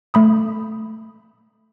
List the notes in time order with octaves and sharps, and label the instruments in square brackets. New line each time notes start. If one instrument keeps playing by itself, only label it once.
[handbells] A3 B5 D#6